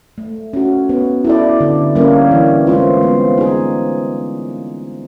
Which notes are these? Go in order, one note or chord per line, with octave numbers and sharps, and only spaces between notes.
A3
C#4 F#4
B3
E4 A4 D5
D3
G3 A#3 C#4
E3
G#3 C4 F4
B3
D#4 G#4